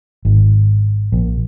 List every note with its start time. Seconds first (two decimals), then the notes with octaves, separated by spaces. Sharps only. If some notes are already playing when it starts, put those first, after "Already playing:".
0.25 G#1
1.12 A#1